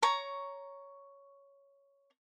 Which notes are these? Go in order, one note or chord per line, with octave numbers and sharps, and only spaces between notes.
C#5 A#5 C#6